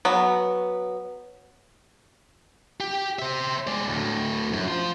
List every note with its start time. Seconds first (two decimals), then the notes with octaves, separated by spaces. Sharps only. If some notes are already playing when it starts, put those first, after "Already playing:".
0.05 F#3 B3
2.80 G4
3.19 C5 E5
3.67 G#3 D5
3.88 D2 A2
4.53 F#2
4.68 F4 C5